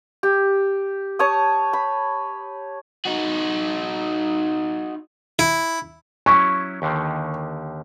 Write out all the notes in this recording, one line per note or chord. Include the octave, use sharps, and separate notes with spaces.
G4
C#5 A5 D#6
B5
D#4 F#4
E4
F#3 C#4 E4 C#6
D#2 D3 D#3